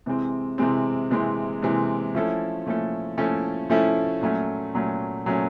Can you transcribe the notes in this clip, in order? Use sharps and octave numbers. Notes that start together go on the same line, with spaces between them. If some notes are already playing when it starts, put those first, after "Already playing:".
C3 E3 G#3 C4
C3 E3 G#3 C4
C3 E3 G#3 C4
C3 E3 G#3 C4
F3 A3 C#4 E4 A4
F3 A3 C#4 E4 A4
F3 A3 C#4 E4 A4
F3 A3 C#4 E4 A4
A#2 F#3 A3 C#4
A#2 F#3 A3 C#4
A#2 F#3 A3 C#4